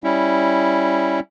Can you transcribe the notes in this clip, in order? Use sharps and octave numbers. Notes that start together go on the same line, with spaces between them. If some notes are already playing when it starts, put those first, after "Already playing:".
G3 C#4 E4